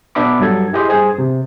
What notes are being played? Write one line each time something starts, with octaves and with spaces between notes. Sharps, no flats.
B2 B3 D4 E5 B5 D6
G2 F#3 A4 G#6
E4 G4 G#4 D#5 C6
G2 G#4 C5
C3